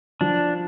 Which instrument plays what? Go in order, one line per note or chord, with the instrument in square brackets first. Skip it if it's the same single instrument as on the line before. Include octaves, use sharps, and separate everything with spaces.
[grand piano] F3 [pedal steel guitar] D4